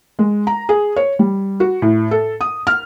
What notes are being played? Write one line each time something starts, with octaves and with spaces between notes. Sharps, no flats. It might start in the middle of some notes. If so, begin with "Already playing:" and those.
G#3
A#5
G#4
C#5
G3
F#4
A2
A4
D#6
F6